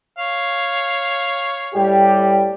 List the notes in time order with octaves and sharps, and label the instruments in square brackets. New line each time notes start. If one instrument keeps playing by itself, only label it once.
[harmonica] C#5 F5
[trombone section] A2 G3 G4